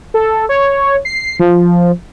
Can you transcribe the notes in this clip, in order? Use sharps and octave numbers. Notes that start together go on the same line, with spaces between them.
A4
C#5
C7
F3